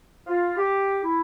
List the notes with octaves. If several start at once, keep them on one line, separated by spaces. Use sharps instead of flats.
F4
G4
E4